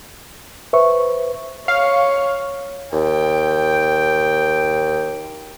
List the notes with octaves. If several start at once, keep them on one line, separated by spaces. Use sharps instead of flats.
B4 C5 E5 C#6
C#5 F5
D#2 G5